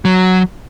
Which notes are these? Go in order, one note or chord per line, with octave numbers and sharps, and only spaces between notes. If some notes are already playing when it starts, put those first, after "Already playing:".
F#3